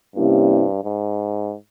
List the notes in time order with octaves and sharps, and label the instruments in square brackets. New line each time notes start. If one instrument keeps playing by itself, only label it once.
[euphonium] G2 [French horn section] C3 G3 A#3 C#4 E4
[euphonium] G#2